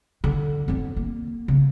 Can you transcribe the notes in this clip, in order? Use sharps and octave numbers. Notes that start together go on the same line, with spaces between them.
D3
F2 D3
A#3
C#3